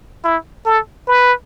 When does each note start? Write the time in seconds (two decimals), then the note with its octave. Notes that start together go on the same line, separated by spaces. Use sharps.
0.24 E4
0.66 A4
1.07 B4